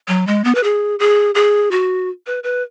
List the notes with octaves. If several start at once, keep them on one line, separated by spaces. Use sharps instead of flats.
F#3
G#3
B3
B4
G#4
G#4
G#4
F#4
B4
B4